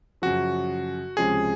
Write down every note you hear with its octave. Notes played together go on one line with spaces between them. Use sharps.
F#2 C#3 F3 F#4
C#2 C3 F3 G#3 C#4 G#4